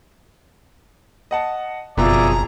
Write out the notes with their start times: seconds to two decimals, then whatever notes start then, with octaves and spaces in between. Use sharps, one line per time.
1.31 D#5 F#5 A5
1.97 F#1 F2 B2 F4 G#4 D5 E5 A#5